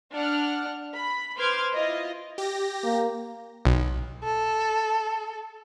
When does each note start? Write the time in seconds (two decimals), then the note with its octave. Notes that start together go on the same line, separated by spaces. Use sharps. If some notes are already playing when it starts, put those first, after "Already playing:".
0.13 D4 D5 F#5 F6
0.93 B5
1.38 B4 C5 C6 D6 F6 G#6
1.74 E4 F4 D#5
2.38 G4 A#6
2.84 A#3
3.65 B1
4.24 A4